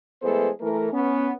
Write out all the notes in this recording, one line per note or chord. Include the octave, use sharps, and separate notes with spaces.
E3 G#3 A3 B3 A4 C5
E3 A3 A#4
B3 C#4